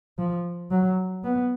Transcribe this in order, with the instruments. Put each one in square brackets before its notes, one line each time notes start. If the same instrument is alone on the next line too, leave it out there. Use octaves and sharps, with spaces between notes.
[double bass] F3
F#3
B3